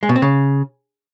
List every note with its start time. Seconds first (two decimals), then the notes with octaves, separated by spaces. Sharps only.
0.03 G#3
0.09 B2
0.16 C4
0.22 C#3